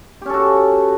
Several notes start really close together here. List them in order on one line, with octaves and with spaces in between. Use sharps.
G4 C#4 A4 F#4